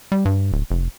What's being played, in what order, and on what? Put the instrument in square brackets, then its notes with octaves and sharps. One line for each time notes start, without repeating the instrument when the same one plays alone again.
[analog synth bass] G3
G2
D1
F1